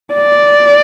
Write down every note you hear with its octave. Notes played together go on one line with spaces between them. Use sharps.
D5